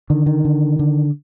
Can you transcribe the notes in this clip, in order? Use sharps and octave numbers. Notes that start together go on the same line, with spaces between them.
D3 D#3
D#3
D3
D3